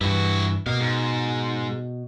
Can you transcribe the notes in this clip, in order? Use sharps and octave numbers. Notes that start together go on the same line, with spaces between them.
G2 E3 E4 F#4
B2 A#4 F5
G#2